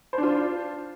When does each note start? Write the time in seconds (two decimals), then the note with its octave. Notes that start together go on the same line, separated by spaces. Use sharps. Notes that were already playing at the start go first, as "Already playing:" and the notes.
0.13 C5
0.18 D4
0.23 F4